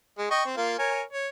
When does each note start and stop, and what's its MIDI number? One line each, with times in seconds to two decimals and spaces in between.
0.18 0.30 56
0.31 0.45 75
0.31 0.45 79
0.31 0.45 85
0.45 0.56 60
0.57 0.78 58
0.57 0.78 65
0.79 1.02 70
0.79 1.02 73
0.79 1.02 80
1.13 1.28 73